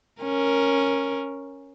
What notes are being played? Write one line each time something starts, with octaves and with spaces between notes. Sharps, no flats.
C#4 A#4